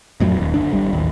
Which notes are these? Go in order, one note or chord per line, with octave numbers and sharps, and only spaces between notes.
F2 A2 F#3
D#1 D#2
F#1 D2 D4
G#1 G3
A1 D#2